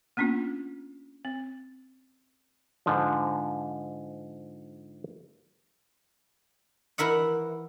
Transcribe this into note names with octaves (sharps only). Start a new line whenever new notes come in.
A#3 B3 C#4 D4 F4
C4
G#2 D3 F3
E3 E4 A#4 E5 F#5